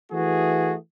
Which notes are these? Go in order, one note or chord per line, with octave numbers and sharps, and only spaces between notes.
E3 A3 F#4 G#4